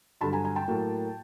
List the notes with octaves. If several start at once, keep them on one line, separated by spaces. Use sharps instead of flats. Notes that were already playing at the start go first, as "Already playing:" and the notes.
G2 D3 F#3 A5 B5
G#5 A#5
G#5 A#5
G5 A5
A2 F#3 A#3